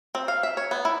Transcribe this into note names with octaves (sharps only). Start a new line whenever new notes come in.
C4
F5
E5
C#5
B3
E4